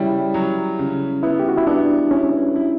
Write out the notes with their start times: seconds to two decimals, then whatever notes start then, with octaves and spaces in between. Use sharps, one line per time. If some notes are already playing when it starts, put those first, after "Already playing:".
Already playing: C#3 G3 E4 C#5
0.34 F#3
0.79 C#3
1.23 B3 E4
1.40 G4
1.49 F#4
1.57 E4
1.67 B3 D4
2.11 C#4 E4
2.56 E4